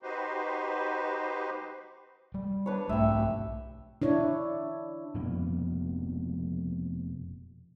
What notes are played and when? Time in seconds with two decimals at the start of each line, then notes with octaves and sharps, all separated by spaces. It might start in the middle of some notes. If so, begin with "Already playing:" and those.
0.03 D#4 F#4 G4 B4 C5
2.34 G3
2.66 D4 B4 C#5
2.89 B1 G#2 A3 E5 G5
4.02 D4 E4 C#5
5.14 F1 F2 B2 A#3